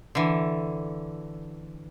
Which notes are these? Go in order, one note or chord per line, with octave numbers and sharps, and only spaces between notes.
D3 E3